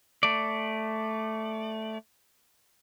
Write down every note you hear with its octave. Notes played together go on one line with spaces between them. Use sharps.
A3 D5